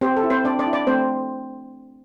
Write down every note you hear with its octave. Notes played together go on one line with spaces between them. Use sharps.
C4 G4 C5
A4
E4
C4 C5
C4 D4 D5
D4 D5
E4
D4 D5
A3 C4 C5